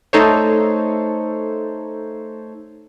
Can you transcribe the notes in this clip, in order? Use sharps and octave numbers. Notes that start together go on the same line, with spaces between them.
A3 D#4 A4 C5 C#5